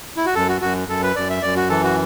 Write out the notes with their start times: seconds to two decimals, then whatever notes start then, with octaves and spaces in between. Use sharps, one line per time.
0.17 E4
0.26 F#4
0.35 F#2 A4
0.49 F#4
0.61 F#2 F#4
0.88 F#2 A4
1.03 B4
1.16 F#2 D5
1.30 E5
1.42 F#2 D5
1.56 F#4
1.70 E3 A4
1.84 F#4